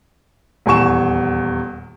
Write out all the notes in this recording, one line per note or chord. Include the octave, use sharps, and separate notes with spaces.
D#1 E2 G#5 C#6 E7